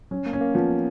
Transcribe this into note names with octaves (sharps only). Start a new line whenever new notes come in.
F#3 C#4
A#3
C#4
A#3
F3 B3